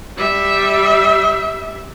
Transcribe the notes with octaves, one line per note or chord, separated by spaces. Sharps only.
G3 E5